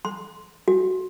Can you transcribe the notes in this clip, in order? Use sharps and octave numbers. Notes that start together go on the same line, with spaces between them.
C6
F#4